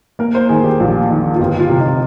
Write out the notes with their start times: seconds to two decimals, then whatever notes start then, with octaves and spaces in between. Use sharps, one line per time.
0.19 A#3 A#4
0.35 C5
0.49 D#3 G#4
0.64 G4
0.80 A#1
1.10 D#3
1.35 F4
1.40 G1 G4
1.60 F4
1.69 C3
1.80 D#4